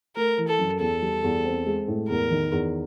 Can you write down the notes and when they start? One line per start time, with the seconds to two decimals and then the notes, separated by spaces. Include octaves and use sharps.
0.16 A3 A#4
0.38 E3
0.48 A4
0.58 F#2
0.80 E2 A4
1.02 G3
1.24 E2
1.45 C4
1.66 G#3
1.88 A2
2.09 E2 A#4
2.30 D#3
2.52 E2